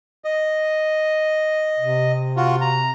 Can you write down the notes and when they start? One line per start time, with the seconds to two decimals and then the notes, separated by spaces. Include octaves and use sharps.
0.25 D#5
1.79 C3
2.37 F4 F#4
2.61 A#5